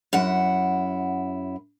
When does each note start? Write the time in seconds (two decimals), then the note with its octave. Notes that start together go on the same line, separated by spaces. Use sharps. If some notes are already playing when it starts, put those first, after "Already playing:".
0.13 F#2 E4 F#5